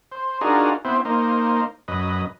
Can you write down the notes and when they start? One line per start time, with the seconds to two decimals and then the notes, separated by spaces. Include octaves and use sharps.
0.12 C5
0.41 D4 D#4 F4 F#4 G#4 A#4
0.85 B3 C4 E4 C5
1.05 A#3 D#4 C5
1.88 F#2 B4 D#5